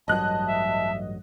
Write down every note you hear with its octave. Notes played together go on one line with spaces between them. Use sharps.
A1 G2 F#3 D#5 A5 F#6
E5